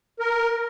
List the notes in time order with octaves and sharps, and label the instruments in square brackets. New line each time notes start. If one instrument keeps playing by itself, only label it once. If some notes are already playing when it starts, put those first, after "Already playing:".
[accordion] A#4